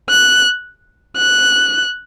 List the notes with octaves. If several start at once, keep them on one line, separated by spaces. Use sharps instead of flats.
F#6
F#6